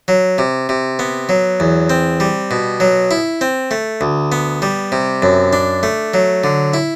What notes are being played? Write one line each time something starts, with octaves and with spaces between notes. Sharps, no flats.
F#3
C3
C3
B3
F#3
E2
C4
G3
B2
F#3
E4
C4
A3
D2
B3
G3
C3
F#2
D4
A3
F#3
D3
E4